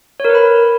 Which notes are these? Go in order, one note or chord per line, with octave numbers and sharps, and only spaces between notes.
A#4 B4 C#5 B5